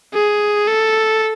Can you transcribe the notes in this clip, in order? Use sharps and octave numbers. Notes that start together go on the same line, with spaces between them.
G#4
A4